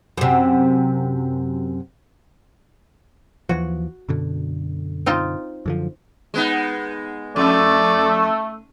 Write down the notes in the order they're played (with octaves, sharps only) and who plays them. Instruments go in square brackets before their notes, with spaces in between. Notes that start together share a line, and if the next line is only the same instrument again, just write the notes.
[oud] F#2 C3
[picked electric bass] D#2 E3 F3 [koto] F#4
[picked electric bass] F#2 B2 D3
[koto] C4 D#4 F4
[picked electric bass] F#2 D3 F3
[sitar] G#3 B3 D#4
[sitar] F2 [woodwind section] A3 [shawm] D5